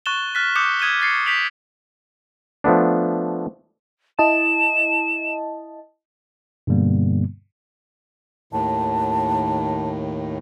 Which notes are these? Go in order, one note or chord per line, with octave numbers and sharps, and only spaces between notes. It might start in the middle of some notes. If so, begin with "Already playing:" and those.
C#6 F#6 A6 E7 G7
F6 F#6 A6 B6
D6 D#6 F#6 G6 C#7 E7
D#6 G#6 D#7 E7 G7
G#6 A6 C7 C#7
G6 B6 D7 F7 F#7
F3 A3 B3 D4
E4 D#5 A5 E7
G2 B2 D3 G3 A#3 B3
D#2 A2 D#3 A5